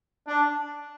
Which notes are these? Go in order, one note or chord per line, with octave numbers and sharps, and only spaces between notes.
D4